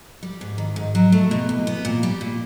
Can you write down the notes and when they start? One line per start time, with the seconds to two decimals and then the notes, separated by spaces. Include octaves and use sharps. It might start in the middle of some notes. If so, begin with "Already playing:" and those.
0.23 G3
0.41 G#2
0.58 D#3
0.76 G#2
0.95 F#3
1.12 A3
1.31 B2
1.49 E2
1.67 B3
1.85 A#2
2.03 G3
2.21 A#2